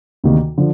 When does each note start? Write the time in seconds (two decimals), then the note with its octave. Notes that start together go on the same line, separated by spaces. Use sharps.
0.24 D2 C3 D#3 A#3
0.58 D3 F3